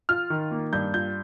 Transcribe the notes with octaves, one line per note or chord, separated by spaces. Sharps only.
F4 F6
D#3
A#3
G2 G6
F4 G6